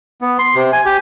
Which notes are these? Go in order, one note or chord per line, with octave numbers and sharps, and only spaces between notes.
B3
C6
C3
G#5
G4